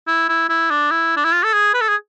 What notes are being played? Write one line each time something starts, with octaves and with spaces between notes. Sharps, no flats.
E4
E4
E4
D4
E4
D4
E4
F4
A4
G#4
B4
A4
G#4